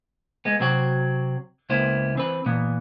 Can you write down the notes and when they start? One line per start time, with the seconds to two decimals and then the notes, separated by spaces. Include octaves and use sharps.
0.45 G#3 B3
0.60 C3 F#3 C4 F#4
1.70 C#2 A#3 B3 E4 C5
2.15 E3 C4 B4
2.46 A#2 E3 B3